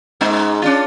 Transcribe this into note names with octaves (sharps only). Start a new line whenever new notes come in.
G#2 G#3 D#4
C#4 D4 F4